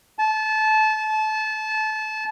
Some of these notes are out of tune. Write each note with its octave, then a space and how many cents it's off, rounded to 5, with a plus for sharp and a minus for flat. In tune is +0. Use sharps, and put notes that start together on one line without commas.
A5 -25